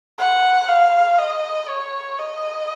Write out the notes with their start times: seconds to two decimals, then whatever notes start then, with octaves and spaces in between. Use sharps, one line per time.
0.19 F#5
0.68 F5
1.19 D#5
1.68 C#5
2.19 D#5